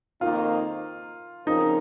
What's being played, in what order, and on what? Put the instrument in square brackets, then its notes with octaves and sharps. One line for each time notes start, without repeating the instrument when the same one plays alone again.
[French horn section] F2 D#3 A#3 D#4 [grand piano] F4
[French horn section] C#3 F3 C4 F4 A#4 [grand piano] D#4